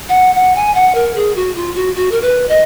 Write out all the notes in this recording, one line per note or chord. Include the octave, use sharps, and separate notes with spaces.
F#5
F#5
G#5
F#5
A#4
G#4
F#4
F4
F#4
F#4
A#4
B4
D#5